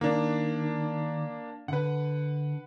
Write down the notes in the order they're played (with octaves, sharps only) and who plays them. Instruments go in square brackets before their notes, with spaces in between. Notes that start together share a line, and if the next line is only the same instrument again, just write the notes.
[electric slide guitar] D#3 [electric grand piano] A#3 D4
[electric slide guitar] D3 [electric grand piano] B4 F#5